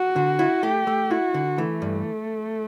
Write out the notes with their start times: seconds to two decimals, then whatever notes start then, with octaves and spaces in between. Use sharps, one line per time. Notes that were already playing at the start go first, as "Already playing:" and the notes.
Already playing: F#4
0.16 D3
0.39 E4
0.63 A3 G4
0.87 A3
1.10 E4 F#4
1.34 D3
1.58 E3 A3
1.82 G2